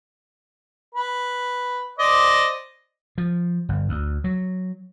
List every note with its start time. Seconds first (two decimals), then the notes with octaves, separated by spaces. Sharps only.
0.95 B4
1.98 C5 D5 D#5
3.18 F3
3.69 G1
3.89 D2
4.24 F#3